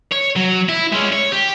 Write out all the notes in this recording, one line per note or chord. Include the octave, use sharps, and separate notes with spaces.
C#5
F#3
E4
G#3 C#4
C#5
G4